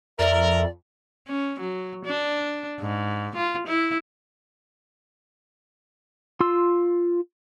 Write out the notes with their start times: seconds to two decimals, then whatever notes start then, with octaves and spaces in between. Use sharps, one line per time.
0.19 F2 A#4 D5 E5
1.28 C#4
1.60 F#3
2.05 D4
2.80 G#2
3.36 F4
3.67 E4
6.40 F4 C6 E6